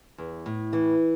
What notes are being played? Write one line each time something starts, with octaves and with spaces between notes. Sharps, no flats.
E2
A2
E3